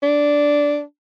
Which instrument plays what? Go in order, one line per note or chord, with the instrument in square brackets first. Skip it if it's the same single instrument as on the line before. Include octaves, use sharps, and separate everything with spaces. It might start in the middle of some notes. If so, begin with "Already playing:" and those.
[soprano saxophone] D4